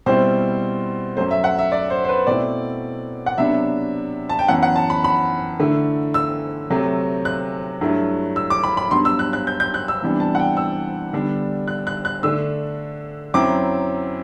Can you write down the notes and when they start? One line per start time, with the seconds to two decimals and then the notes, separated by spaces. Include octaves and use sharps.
0.06 B2 G3 C4 E4 C5
1.17 F#2 F#3 A3 C5
1.31 E5
1.44 F#5
1.59 E5
1.72 D5
1.90 C5
2.04 C5
2.09 B4
2.27 B2 A3 C4 E4 D5
3.26 F#5
3.38 C3 F#3 B3 D4 E5
4.29 A5
4.39 G5
4.48 F#2 E3 B3 F#5
4.63 F#5
4.76 A5
4.90 B5
5.04 B5
5.60 D3 A3 E4
6.14 E6
6.70 C3 F#3 A3
7.25 F#6
7.81 G2 F#3 A3 E4
8.36 E6
8.50 D6
8.63 B5
8.77 B5
8.91 G2 F#3 B3 C6
9.05 E6
9.19 F#6
9.33 F#6
9.47 G6
9.60 G6
9.74 F#6
9.88 E6
10.02 C3 E3 G3 B3 D4
10.20 A5
10.35 F#5
10.39 G5
10.57 E6
11.13 D3 G3 B3 D4
11.68 F#6
11.87 F#6
12.05 F#6
12.23 D3 A3 D4 E6
13.34 F#2 F#3 C4 E4 D6